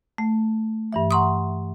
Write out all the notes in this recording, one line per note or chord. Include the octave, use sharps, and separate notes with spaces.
A3
G2 E3 E5
F#5 A#5 C6 C#6 D#6